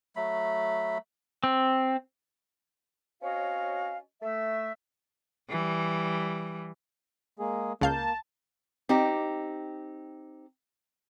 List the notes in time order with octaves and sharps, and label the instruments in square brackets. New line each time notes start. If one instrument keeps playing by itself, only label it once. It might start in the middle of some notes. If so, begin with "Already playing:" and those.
[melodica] F#3 A3 B5
[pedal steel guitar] C4
[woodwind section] C4 C#4 F#4 C#5 D#5 F5
A3 E5
[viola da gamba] E3 G3
[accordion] G#3 A#3 G#4
[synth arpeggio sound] C#2 F5 G6 [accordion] A#3 [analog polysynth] A5
[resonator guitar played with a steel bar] C4 D#4 G4